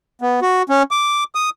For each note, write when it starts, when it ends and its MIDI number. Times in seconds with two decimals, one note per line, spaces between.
0.21 0.40 59
0.42 0.62 66
0.69 0.83 61
0.91 1.24 86
1.35 1.50 87